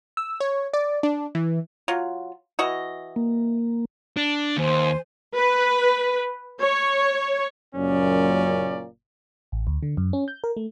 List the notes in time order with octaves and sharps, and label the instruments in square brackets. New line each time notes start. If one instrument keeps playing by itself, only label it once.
[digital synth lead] E6
C#5
D5
D4
E3
[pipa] F#3 F4
E3 F#4 D#5
[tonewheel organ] A#3
[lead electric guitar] D4
[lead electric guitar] D#2 [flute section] C5 G#5
[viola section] B4
C#5
[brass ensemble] F#1 F#2 A#2 C#4 D5
[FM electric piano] A1
D2
D3
F#2
C#4
G6
A#4
A3